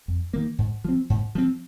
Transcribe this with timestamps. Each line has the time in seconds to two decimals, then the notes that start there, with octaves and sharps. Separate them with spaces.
0.08 F2
0.33 D#3 A#3
0.58 G#2
0.85 F3 C4
1.10 G#2
1.35 F3 C4